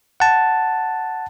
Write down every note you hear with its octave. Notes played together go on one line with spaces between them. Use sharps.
F#5 A5